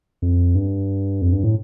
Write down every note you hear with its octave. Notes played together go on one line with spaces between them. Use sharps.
F2
G2
F2
G2
A2